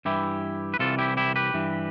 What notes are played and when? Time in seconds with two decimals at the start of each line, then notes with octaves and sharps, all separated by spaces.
0.05 G2 E3 E4 G4
0.74 B4
0.79 C2 C3 E3 F4 A4
0.99 E4 G4
1.17 E4 G4
1.36 G4 B4
1.54 G2 E3